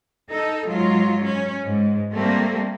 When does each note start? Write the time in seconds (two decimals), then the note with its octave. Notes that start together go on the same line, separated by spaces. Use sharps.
0.30 D#4 A4
0.67 G#2 F#3 F4
1.25 C#4
1.64 G#2
2.12 G3 A3 A#3 C4